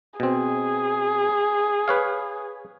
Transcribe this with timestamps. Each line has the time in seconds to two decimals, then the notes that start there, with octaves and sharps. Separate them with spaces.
0.20 B2 C4 G#4
1.88 B4 C#5 F5